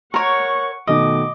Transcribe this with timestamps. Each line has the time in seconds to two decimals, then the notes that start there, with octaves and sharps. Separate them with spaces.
0.14 A#4 C#5 F#5 C#6
0.87 B2 D#3 A3 D#5 D6